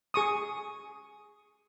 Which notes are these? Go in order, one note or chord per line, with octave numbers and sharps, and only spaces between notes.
G#4 C#6 D#6